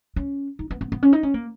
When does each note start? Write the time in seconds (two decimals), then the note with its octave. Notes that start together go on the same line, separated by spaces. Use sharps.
0.16 C#4
0.59 D#4
0.71 B3
0.81 B3
0.92 B3
1.03 C#4
1.13 D#4
1.23 C#4
1.34 A#3